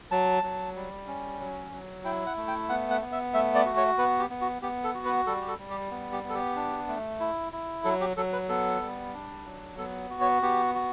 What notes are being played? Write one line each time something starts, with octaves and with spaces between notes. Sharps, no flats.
F#3 A5
F#3
G3
C#4
F#3
F#3
E4 G5
F#5
A3
G5
B3 F#5
F#5
B3
E5
A3 E5
D5
F#4
C#5
B3 B4
G4
B3
F#4
B3 G4
A4
F#4
B4
G3 A4
G4
A4
G3
G4
B3
G4
B3
A4
G4
D4
A3
E4
E4
F#3 A4
G4
F#3 A4
B4
B3 A4
G3
D4
F#3
B3 A4
F#4
C#5
B3 G4
F#4